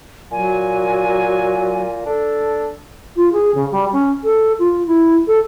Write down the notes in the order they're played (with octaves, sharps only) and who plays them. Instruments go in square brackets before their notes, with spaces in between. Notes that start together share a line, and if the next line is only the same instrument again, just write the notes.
[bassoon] A#2 [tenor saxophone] F#3 [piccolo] G#5
[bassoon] D4 [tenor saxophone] A4
[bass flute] F4
G#4
C#3
G3
C#4
A4
F4
E4
A4